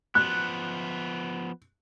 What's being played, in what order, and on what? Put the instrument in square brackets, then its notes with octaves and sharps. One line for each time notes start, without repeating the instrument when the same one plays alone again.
[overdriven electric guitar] F3 B3 [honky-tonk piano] F#6